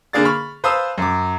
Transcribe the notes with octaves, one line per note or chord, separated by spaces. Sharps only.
D3 A#3 G#4 D5 F5 A6
B5 C#6 F6
B4 C5 F5 A5 D#6 E6
F#2 D6